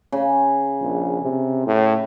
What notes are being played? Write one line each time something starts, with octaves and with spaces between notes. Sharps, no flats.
C#3
A#1
C3
A2